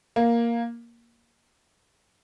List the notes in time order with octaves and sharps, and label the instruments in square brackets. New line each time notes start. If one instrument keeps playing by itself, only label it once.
[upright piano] A#3